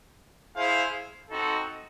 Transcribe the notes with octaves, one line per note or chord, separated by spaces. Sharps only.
E4 G#4 C5 F5
C4 D#4 F#4 A4